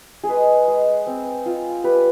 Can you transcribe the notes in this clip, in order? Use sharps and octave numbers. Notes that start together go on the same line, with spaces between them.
G#4
G#3 B4
G#3
C4
F4
G3 B4